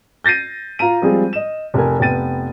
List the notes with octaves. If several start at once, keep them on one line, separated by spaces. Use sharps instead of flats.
G6 A6 A#6 C7 D#7
F4 F5 A#5 D#7
F3 G3 G#3 C4 F4 G#4
D#5 E7
F1 A#4 G#5
F1 B3 G5 A6 D#7